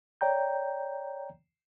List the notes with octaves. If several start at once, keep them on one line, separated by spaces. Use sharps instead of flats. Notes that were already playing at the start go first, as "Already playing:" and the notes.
C#5 D5 G5 A#5 G6